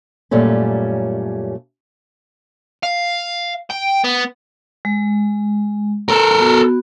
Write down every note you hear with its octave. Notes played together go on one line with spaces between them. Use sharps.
F#2 A#2 G3 A3 C#4
F5
G5
B3
G#3
A4 A#4
B3 F#4